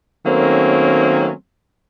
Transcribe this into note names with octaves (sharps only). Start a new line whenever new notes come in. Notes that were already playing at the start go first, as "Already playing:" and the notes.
D#3 F#3 A3 A#3 C4 C#4